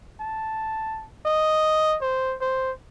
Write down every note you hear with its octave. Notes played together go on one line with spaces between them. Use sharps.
A5
D#5
C5
C5